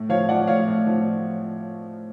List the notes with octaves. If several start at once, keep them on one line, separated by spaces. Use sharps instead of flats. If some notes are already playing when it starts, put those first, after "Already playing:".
Already playing: A2
F3 C#5 F5
F3 D5 F#5
A2 C#5 F5
A2
F3